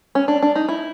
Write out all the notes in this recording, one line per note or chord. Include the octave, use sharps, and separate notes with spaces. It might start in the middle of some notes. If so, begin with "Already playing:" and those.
C#4
D4
D4
D#4
E4